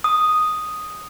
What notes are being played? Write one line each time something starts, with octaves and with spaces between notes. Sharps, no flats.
D#6